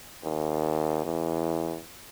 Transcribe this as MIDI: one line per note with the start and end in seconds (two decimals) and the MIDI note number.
0.24 1.05 39
1.05 1.79 40